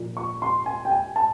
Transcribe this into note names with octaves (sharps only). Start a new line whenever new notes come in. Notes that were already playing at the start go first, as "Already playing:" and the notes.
Already playing: A#2 F3
C#6
C6
G#5
G5
G#5
A5